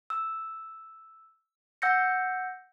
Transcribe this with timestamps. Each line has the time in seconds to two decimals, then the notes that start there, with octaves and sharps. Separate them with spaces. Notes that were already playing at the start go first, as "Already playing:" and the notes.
0.10 E6
1.82 F#5 E6 G6 A#6 C#7